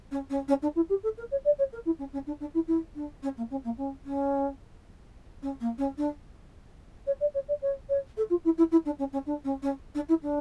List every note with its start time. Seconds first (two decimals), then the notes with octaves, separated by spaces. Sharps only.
0.11 C#4
0.30 C#4
0.48 C#4
0.62 D4
0.75 E4
0.89 G4
1.03 A4
1.17 A#4
1.31 C#5
1.44 D5
1.58 C#5
1.72 A#4
1.85 E4
1.99 C#4
2.13 C#4
2.27 D4
2.40 D4
2.54 E4
2.67 E4
2.95 D4
3.22 C#4
3.37 A#3
3.50 C#4
3.64 A#3
3.77 C#4
4.05 C#4
5.42 C#4
5.60 A#3
5.78 C#4
5.97 D4
7.06 C#5
7.20 D5
7.34 C#5
7.48 D5
7.61 C#5
7.89 C#5
8.17 A4
8.30 F4
8.44 E4
8.57 E4
8.71 E4
8.85 D4
8.99 C#4
9.12 C#4
9.26 D4
9.44 C#4
9.62 C#4
9.94 D4
10.08 E4
10.22 D4